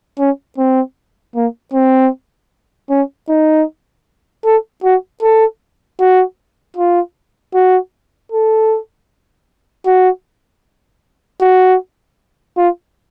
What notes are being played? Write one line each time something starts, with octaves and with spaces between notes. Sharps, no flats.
C#4
C4
A#3
C4
C#4
D#4
A4
F#4
A4
F#4
F4
F#4
A4
F#4
F#4
F4